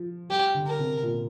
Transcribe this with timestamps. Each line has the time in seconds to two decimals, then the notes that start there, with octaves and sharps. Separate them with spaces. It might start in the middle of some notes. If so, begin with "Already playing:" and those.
Already playing: F3
0.29 G3 G4
0.54 D3
0.66 A#4
0.79 C3
1.03 A#2